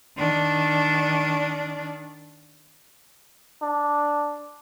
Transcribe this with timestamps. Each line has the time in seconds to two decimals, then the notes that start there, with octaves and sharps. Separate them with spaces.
0.17 D#3 D4
3.62 D4